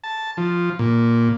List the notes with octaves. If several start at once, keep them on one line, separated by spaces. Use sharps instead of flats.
A5
F3
A#2